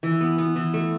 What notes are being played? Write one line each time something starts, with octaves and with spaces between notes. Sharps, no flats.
E3
B3
B3
E3
A3